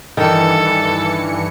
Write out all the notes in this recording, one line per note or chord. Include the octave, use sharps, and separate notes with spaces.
G2 D#3 E3 A4 C#7